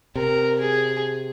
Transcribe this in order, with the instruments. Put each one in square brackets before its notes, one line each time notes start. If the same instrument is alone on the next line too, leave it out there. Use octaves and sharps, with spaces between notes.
[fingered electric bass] C3 [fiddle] A#4
[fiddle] G#4